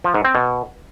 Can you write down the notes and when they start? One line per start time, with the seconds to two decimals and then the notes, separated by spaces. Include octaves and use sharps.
0.04 F3
0.14 G#2
0.25 C4
0.35 B2